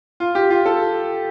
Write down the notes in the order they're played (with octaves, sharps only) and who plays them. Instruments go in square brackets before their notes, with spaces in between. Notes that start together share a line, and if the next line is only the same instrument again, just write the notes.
[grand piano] F4
G4
F4
A4